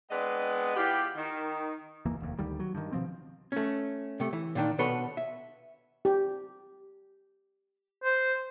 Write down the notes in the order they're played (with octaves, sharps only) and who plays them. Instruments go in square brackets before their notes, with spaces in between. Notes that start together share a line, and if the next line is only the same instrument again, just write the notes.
[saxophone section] G#3 B3 C4 D4 B4 D#5
E3 B3 F4 G4
D#3
[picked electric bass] F#1 D#2 E3 A#3
F1 D#2
D2 D#3 G3
F#3
G2 D#3
B2 F3 C4
[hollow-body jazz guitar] A3 C#4
C3 A3
E3
A#2 D#3 D4
B2 D4 A4 B4 C#5 C6
E5
[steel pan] G4
[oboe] C5